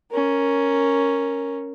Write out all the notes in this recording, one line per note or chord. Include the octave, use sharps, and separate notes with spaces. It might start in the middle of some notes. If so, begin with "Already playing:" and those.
C#4 A#4